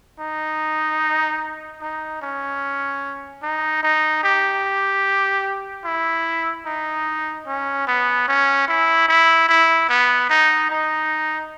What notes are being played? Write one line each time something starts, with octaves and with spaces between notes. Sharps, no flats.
D#4
D#4
C#4
D#4
D#4
G4
E4
D#4
C#4
B3
C#4
E4
E4
E4
B3
D#4
D#4